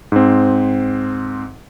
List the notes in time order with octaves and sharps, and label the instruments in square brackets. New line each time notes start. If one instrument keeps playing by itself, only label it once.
[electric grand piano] G#2 C4